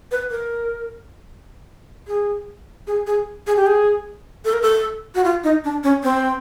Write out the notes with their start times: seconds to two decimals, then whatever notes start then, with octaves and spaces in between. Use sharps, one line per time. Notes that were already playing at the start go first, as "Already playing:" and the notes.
0.11 B4
0.31 A#4
2.08 G#4
2.87 G#4
3.07 G#4
3.47 G#4
3.56 G4
3.67 G#4
4.45 A4
4.53 A#4
4.62 A4
5.15 F#4
5.24 F4
5.44 D#4
5.64 D4
5.84 C#4
6.04 C4